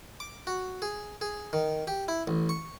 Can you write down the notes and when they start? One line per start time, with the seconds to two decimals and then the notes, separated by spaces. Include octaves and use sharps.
0.20 D6
0.47 F#4
0.82 G#4
1.21 G#4
1.53 D#3
1.87 G4
2.08 E4
2.27 A1
2.49 C#6